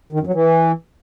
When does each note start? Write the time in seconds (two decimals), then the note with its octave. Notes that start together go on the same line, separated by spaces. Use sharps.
0.13 D#3
0.20 F#2
0.27 F#3
0.34 E3